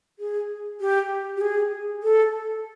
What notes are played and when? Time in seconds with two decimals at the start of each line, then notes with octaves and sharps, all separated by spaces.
0.19 G#4
0.81 G4
1.37 G4
1.41 G#4
2.03 A4